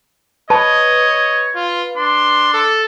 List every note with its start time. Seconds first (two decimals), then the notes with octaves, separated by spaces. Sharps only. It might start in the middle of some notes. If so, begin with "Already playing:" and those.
0.50 B4 C#5 D#5 A5
1.55 F4
1.97 D4 C6
2.53 A4